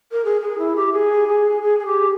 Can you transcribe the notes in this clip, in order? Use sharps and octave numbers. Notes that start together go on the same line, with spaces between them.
A#4
G#4
G#4
E4
G4
G#4
G#4
G#4
G#4
G4